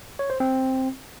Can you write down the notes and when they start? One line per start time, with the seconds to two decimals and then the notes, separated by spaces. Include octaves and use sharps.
0.19 C#5
0.30 C5
0.40 C4